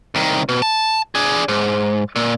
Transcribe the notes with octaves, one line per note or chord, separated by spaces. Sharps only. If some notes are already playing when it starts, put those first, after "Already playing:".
C2 D#3
B2
A5
D4 G#4
G#2
A#2